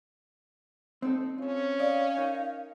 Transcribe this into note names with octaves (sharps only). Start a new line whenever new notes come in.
C4 D#4 A4 D#5
C#4 F4 A4
D5 D#5 F5
D#4 A#4 G#5